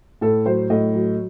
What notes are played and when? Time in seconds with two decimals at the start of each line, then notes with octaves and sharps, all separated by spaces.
0.21 A2 A4
0.46 F#3 C5
0.70 A2 D#5
0.94 F#3